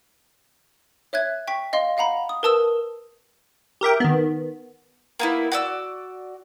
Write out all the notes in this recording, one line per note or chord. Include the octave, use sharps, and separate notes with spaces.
C#5 E5 F#6 G#6
G5 C#6 B6
D#5 F5 C6
D#5 F5 F#5 A#5 B5
D#6
A#4 B4 A5 D#6 E6 E7
G4 A#4 E5 G5
D#3 B3
A#3 B3 E4
F#4 D5 E6